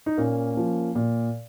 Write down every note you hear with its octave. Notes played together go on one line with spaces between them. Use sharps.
D#4
A#2 A#3 C#4
F3
A#2